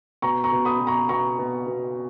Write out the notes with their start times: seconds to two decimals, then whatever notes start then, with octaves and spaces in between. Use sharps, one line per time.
0.22 B2 A#5 C#6
0.44 A#5 C#6
0.52 B2
0.65 B5 D#6
0.80 B2
0.87 A#5 C#6
1.09 B2 A#5 C#6
1.39 B2
1.67 B2